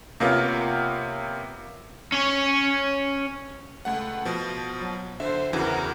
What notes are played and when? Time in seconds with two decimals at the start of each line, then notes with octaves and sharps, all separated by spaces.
0.20 C3 A#3 B3 C#4 F4
2.12 C#4 C#5
3.85 C#2 A3 F#5
4.25 B2 F3
4.79 F#3
5.20 D3 C5 E5
5.53 E2 C#3 E3 F#4 A#4